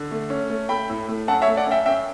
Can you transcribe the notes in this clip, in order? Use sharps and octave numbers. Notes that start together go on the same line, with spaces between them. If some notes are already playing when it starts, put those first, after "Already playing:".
Already playing: D3
A3
C#4
A3
A3 G5 B5
A2
A3
F#2 F#5 A5
C#5 E5
A3
D5 F#5
F#2 E5 G5
F#2 E5 G5